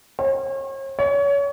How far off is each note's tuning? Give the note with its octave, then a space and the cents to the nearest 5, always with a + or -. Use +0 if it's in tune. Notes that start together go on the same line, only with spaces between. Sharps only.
C#5 -40
C#5 +30